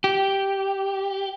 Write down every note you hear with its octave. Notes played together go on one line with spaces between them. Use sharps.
G4